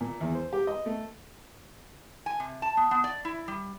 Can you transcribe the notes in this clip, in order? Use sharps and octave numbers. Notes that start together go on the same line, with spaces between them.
A#2
E2
C5
G4
D#5
A3
G#5
C3
A5
B3
B3
D5
E4
G3